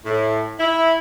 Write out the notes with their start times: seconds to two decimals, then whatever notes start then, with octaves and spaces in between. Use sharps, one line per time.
0.05 A2
0.59 E4